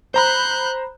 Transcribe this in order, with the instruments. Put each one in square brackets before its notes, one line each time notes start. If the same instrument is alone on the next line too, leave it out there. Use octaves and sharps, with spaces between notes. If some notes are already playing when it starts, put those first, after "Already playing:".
[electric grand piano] C5 A#5 B5 [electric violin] F#6 G6